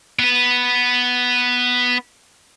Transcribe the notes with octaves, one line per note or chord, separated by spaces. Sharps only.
B3 B4